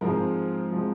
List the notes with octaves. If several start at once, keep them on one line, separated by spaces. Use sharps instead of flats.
G#2 F3 G#3 C4 A#4
F3 G#3 C4